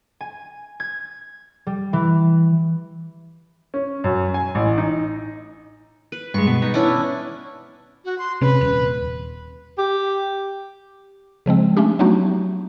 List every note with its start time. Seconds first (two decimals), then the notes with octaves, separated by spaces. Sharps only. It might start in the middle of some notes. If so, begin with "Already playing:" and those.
0.21 G#5
0.80 G#6
1.67 G3
1.93 E3
3.74 C#4
4.04 F#2
4.34 G#5
4.55 A1
4.78 D#4
6.12 B4
6.34 G2 G#3 C#6
6.47 B2 B4
6.62 B3 D#4
6.74 C#4 D4 E4
8.05 F#4
8.18 C6
8.41 C3 C#4 B4
8.61 D#1
9.78 G4
11.46 C#3 F3 G#3 C4
11.77 A3 C#4 D4 G4
11.99 F#3 A3 B3 D4 D#4 F#4